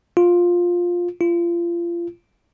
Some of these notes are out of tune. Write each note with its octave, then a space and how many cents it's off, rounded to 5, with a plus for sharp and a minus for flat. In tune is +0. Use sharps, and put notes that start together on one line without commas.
F4 +10
F4 -30